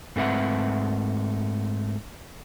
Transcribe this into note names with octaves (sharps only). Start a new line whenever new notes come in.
G#2 A3 C4 B4 E5 F#5